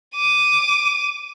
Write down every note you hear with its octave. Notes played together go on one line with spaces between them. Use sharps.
D6 D#7